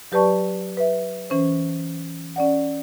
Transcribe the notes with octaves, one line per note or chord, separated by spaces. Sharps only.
F#3 G4 B4 D5 A5 C#6
B4 E5
E3 C#4 C5
C#4 D5 F#5